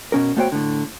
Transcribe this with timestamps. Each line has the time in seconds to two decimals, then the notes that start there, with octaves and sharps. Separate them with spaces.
0.12 B2 C#4 A#4
0.37 A3 B3 F#4 C5 C#5 G5
0.52 A2 D3